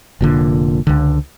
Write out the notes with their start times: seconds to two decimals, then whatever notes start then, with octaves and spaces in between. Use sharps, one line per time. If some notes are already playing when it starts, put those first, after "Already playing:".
0.21 F1 A#2 D3
0.87 C#2 D3